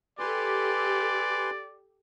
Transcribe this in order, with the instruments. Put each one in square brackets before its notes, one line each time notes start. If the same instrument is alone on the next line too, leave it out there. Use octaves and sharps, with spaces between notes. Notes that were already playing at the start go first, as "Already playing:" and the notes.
[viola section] G4 A4 [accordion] B4 G#5 C6 [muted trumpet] D5